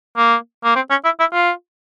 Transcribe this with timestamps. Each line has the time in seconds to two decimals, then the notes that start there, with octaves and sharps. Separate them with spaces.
0.17 A#3
0.64 A#3
0.75 C4
0.90 C#4
1.04 E4
1.20 E4
1.33 F4